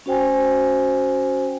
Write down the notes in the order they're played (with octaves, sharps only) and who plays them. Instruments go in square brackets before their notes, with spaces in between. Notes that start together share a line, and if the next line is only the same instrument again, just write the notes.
[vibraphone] C#4 F#4 C5 G5 G#5